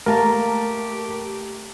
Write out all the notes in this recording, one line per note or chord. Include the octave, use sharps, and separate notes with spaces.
A3 A#3 G4 A#4 A5 A#5